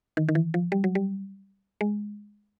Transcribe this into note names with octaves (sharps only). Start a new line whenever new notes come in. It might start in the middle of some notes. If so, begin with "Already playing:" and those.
D#3
D#3
E3
F3
G3
F#3
G3
G#3